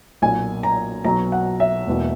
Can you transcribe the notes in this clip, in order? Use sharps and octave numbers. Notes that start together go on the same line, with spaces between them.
B1 A#2 A#3 G#5
A#5
B1 B2 F#3 A#5
F#5
E5
E1 E2 B2 A#3